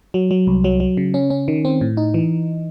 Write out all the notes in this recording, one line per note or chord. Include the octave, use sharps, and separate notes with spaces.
F#3
F#3
C2
F#3
F#3
C#3
C#4
C#4
D#3
C4
A2
D#4
E3